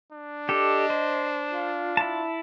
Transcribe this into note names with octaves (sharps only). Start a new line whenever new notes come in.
D4
G4 A4 D#5
C5
F4
E4 A5